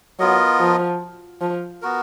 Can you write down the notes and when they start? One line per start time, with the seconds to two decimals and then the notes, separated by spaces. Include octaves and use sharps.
0.19 F#3 B3 F4 A#4 D#5
0.60 F3
1.41 F3
1.82 B3 F#4 A#4